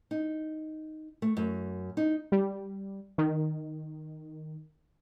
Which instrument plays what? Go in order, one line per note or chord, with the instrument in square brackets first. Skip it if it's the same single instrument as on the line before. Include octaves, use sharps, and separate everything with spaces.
[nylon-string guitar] D#4
A3
F#2
D#4
[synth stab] G3
D#3